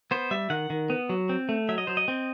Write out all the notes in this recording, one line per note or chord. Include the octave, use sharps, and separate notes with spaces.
B3 C5
G3 E5
D#3 F#5
D#3
B3
F#3
C4
A3
F#3 E5
D#5
F#3 C5
D#5
C4